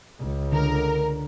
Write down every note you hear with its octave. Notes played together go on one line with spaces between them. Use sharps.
C#2
D3 A#4